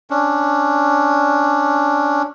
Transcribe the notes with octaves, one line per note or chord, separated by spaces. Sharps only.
C#4 D4